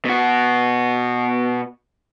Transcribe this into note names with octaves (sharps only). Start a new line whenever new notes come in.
B2 F#4